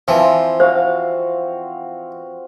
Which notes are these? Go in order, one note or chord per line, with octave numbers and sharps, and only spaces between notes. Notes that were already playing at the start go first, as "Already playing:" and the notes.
E3 F3 C4
F#4 C5 F5